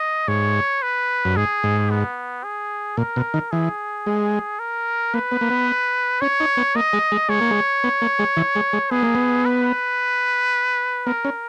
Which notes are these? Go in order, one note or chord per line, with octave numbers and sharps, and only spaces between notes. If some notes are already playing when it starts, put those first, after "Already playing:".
Already playing: D#5
G#2 C#5
B4
F#2
G#2 G#4
G#2
B3
G#4
A#2 A#4
B2
D#3
E3 G#4
G#3
A#4
A#3 B4
B3
A#3
B3
C#4 C#5
D#4
B3
A#3 D#5
G#3
G#3
G#3 C#5
A#3
G#3
B3
A#3
G#3
E3
G#3
G#3
B3 G#4
A#3
B3
B4
B3 A#4
C#4